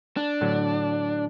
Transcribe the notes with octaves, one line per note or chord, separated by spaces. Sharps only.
D4
A2 D3 F#3